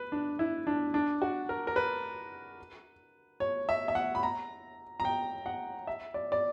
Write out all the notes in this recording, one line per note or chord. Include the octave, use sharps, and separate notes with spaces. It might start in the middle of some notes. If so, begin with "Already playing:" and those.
Already playing: B4
D4
E4
D4
D4
F#4
A#4
A#4
B4
C#5
E5
E5
F#5
B5
A#5
A#5
G5
F#5
E5
D5
D5